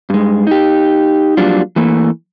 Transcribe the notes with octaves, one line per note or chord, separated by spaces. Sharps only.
G2 G#3
D#4 G4
F2 F#3 G3 A#3 D4 F4
E3 A3 A#3